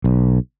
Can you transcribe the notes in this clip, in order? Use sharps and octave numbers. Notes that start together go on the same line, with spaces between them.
B1